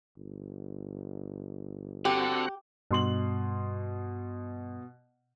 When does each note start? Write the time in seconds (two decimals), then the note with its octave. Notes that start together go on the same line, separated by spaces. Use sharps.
0.17 G1
2.05 D3 C4 F#4 G4 F#5
2.91 G2 B2 C6 F#7